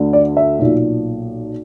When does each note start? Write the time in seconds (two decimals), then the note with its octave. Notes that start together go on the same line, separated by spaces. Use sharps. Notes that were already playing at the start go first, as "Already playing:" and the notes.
Already playing: D2 D3
0.13 D5
0.37 E5
0.59 B1 A#2